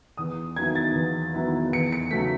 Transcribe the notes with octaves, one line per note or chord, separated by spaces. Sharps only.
E2 D#6
D#3 F#3 B3 E4 G#6
A6
E2
D#3 F#3 B3 E4
E2 C#7
C#7
C#3 F#3 A3 B6